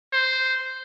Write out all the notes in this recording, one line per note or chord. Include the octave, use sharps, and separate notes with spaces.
C5